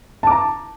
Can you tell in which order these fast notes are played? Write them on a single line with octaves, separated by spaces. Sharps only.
A5 D6 A#5